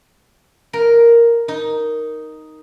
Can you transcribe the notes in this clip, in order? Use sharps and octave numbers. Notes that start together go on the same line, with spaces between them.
A#4
D#4